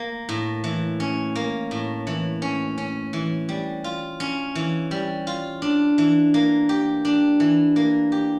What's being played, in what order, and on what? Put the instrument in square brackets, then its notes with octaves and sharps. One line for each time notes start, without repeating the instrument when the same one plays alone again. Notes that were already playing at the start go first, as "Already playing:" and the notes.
Already playing: [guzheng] A#3
A2
E3
C#4
A#3
A2
E3
C#4
C#4
E3
G3
F4
C#4
E3
G3
F4
D4
E3
A#3
G4
D4
E3
A#3
G4